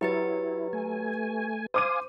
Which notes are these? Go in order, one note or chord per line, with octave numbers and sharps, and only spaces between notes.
F#3 E4 G4 B4 A6
A3 G#5
C5 F5 G#5 D6 D#6 D#7